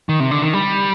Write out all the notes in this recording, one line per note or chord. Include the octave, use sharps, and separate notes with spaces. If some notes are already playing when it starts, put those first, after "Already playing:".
D#3
C3
D3
D#3
G3